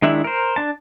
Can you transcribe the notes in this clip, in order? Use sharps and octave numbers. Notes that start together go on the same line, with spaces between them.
D#3 G#3 D4 E4 E5
A#4 C5
D4 A5